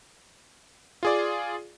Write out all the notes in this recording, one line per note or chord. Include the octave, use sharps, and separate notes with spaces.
F4 G#4 D5